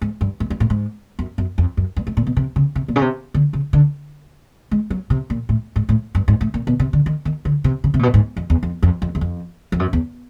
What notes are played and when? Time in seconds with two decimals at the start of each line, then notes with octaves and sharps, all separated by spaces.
0.01 G#2
0.21 G2
0.40 G#2
0.50 G2
0.60 A2
0.70 G#2
1.19 F#2
1.38 F#2
1.58 F2
1.77 F#2
1.96 G2
2.07 G#2
2.17 A#2
2.27 B2
2.37 C3
2.56 C#3
2.75 C3
2.88 A#2
2.96 C#3
3.02 C3
3.34 D3
3.53 C#3
3.73 D3
4.71 G#3
4.90 F#3
5.10 C3
5.30 A#2
5.49 A2
5.76 G#2
5.89 A2
6.15 G2
6.28 G#2
6.41 A2
6.54 A#2
6.67 B2
6.79 C3
6.93 D3
7.06 D#3
7.25 D#3
7.45 D3
7.64 C3
7.84 C#3
7.94 C3
7.99 A#2
8.03 B2
8.14 G#2
8.36 F2
8.50 E2
8.63 F2
8.83 F2
9.02 F2
9.15 E2
9.21 F2
9.72 F2
9.80 F#2
9.93 E2